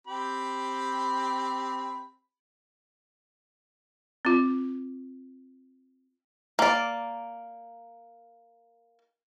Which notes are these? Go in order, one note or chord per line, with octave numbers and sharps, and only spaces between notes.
C4 G4 B5
C4 F4
A#3 D5